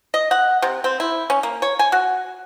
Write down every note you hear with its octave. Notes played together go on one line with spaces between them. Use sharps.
D#5
F#5
C3
C4
E4
C#4
A#3
C#5
G#5
F#4